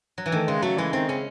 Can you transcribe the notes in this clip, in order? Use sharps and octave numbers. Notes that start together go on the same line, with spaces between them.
F#3
E3
D#3 A3
C#3 G#3
F#3 A3
E3 G#3
D#3 C4
C#3 C#4